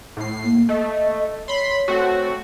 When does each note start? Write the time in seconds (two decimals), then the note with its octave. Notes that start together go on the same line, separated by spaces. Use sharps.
0.17 A2 C7
0.44 A#3
0.69 A3 D#5
1.48 C#5 B5 C6
1.88 A3 C4 F#4